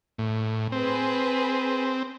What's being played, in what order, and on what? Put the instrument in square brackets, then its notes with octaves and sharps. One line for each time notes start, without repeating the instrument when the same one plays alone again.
[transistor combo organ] A2
[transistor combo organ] C4 [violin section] G#4 B4